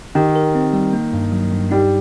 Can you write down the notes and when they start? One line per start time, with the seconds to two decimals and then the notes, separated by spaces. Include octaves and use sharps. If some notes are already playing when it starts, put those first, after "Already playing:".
0.15 D#3 G4
0.36 A#4
0.55 C4
0.73 G3
0.93 A#3
1.13 G2
1.32 F#3
1.52 G2
1.71 G3 D#4